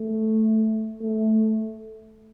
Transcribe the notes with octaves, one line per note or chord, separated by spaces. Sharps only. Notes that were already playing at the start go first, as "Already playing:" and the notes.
Already playing: A3
A3